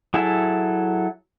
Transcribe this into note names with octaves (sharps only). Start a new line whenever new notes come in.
F#3 E4 G#4 A4 E5